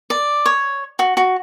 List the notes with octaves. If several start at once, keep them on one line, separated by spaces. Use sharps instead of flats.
D5
C#5
F#4
F#4